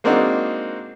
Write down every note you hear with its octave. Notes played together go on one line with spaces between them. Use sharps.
G#3 A#3 C4 D4 D#4 F#4